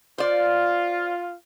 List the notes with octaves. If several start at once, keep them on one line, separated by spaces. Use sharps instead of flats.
F4 C5 D5